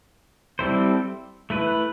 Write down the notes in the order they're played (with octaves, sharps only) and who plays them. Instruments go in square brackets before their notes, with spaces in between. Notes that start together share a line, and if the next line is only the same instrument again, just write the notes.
[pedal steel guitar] G3 C4 E4 A4 C5
A3 E4 B4